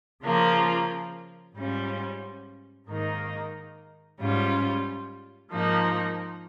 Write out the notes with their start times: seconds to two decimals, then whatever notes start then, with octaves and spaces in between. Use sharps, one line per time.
0.23 C#3 F3 A#3 F4
1.55 G#2 G3 C#4 F4
2.87 G#2 D#3 A#3 D#4
4.19 G#2 G3 C#4 F4
5.50 G#2 F3 A#3 D#4